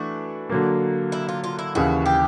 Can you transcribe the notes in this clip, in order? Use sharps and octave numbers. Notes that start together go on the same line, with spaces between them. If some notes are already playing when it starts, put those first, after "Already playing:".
Already playing: E3 A3 D4 F#4
D3 F#3 A#3
E4
F4
F4
E4
D#2 C#3 E3 F#4
G4